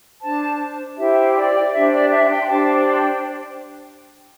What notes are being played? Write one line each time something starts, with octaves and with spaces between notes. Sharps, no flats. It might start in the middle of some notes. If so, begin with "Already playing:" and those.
D4 C5 A5
E4 G4 C5 E5
D5
D4 G4 C5 E5
D5
E5
G5
C6
D4 G4 C5 A5
G5